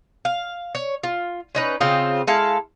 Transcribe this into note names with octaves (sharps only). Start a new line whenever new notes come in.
F5
C#5
F4
C#4 D#4 B4
C#3 C4 F4 D#5
G#3 E4 A4 F5